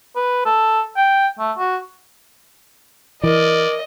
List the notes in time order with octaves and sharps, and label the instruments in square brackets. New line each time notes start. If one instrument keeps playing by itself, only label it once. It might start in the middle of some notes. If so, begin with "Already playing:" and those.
[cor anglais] B4
A4
G5
A3
F#4
[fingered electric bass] E3 [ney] A#4 [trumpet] D5 [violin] D#5